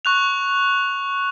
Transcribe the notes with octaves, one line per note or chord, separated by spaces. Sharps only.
C#6 F#6 F7